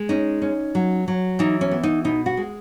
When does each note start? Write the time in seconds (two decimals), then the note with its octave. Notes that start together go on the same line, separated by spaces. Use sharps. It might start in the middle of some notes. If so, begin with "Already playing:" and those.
Already playing: G#3
0.09 C#4 D#4
0.42 C#4
0.75 F#3
1.08 F#3
1.39 E3 D#4
1.61 C#4
1.71 B3
1.83 D#4
2.04 B2 D#4
2.26 F#4
2.37 G#3